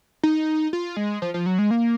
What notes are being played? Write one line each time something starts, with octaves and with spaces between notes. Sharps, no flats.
D#4
F4
G#3
F3
F3
F#3
G#3
A#3